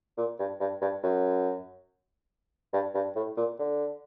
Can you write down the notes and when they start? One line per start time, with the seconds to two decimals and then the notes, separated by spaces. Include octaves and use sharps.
0.17 A#2
0.39 G2
0.60 G2
0.81 G2
1.03 F#2
2.73 G2
2.95 G2
3.15 A2
3.37 A#2
3.58 D3